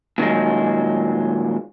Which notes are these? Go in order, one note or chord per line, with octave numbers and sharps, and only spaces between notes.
A#2 D#3 F#3 G#3